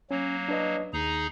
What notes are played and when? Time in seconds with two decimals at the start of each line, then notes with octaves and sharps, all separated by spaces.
0.11 F#3 A#3 C#4
0.49 D4 B4 D#5
0.93 D#2 D#4 G#4 A#5